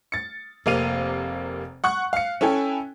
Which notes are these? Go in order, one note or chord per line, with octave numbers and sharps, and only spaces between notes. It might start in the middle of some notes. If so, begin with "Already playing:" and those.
A6 C#7
F1 C3 A#3 F5 D#7 F7
F#5 C#6 F#6
F5 C#7
C#4 E4 A4 G5 G#5